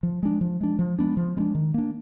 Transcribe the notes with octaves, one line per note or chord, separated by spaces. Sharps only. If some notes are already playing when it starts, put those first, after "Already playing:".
F3
G#3 D4
F3
G#3 D4
F3
G#3 B3 D4
F3
G#3 B3 D4
D#3
A#3 D4